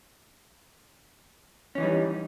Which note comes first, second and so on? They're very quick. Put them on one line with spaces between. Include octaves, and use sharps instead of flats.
C#4 E3 D#4 G3